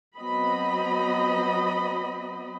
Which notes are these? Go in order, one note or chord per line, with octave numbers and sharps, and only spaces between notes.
F#3 B3 C4 D#5 B5